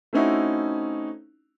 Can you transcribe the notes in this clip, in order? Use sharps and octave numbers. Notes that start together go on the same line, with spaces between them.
A3 C4 C#4 D#4 E4 F#4